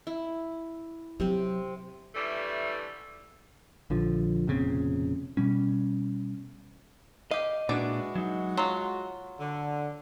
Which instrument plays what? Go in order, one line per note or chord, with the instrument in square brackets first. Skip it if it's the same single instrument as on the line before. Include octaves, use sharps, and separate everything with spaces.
[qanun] E4
[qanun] C3 C4 G4 [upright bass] F#3
[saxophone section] D3 E3 G3 A3
[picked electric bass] A#1 D3 F3
F1 A#2 C#3 C4
B2 G3 C#4
[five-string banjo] G4 F5 [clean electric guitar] D#5
[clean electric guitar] A#2 D4 [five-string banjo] E3 D5 [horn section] G#3 F#4
[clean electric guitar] F#3 D#4
[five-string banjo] F#3 F4 [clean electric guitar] C6
[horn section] D3